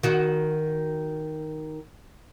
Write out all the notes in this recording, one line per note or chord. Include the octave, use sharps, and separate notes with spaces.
D#3 F#4